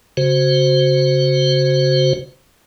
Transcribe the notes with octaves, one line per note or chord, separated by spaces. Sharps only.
C#3 F#4 C5